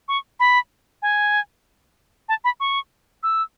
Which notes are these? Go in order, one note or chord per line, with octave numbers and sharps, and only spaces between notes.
C#6
B5
G#5
A5
B5
C#6
E6